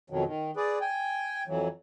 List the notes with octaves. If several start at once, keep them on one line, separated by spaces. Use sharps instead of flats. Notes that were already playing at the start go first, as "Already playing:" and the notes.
F2 B2 D#3 F#3
D#3
G#4 B4 D5
G5 G#5
F2 E3 F#3